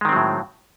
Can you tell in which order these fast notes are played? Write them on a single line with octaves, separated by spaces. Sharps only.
G#3 D#3 C4 F#3 A2